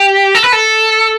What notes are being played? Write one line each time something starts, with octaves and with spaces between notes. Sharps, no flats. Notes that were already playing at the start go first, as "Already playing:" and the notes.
Already playing: G4
A4
B4
A4